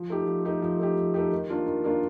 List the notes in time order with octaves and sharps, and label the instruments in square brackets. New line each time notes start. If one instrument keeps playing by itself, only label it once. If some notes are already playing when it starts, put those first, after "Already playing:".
Already playing: [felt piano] F3
A3 D#4 G4
F3
A3 D#4 G4
F3
A3 D#4 G4
F3
A3 D#4 G4
D#3
A#3 D4 F4
D#3
A#3 D4 F4